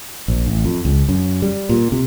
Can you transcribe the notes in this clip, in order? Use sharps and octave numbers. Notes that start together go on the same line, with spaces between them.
A#1
A1
F2
C#2
F#2
G3
A#2
C3